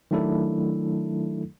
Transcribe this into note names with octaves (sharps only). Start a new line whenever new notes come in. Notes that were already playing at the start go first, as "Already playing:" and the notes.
D#3 F#3 A3 D4 E4 A4